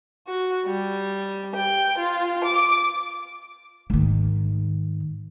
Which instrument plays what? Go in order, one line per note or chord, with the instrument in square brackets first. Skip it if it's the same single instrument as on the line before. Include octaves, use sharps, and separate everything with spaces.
[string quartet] F#4
G3
G5
F4
D6
[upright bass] G#2 D#3